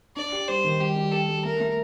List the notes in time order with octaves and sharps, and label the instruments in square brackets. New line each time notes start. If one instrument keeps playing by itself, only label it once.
[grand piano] D4 [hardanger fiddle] D5
[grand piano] G4
[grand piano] G3 [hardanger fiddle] C5
[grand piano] D#3
[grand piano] G3 [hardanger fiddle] G4
[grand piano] G3
[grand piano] G4 [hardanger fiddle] A4
[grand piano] G3
[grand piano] A3 [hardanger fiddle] A#4
[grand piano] A3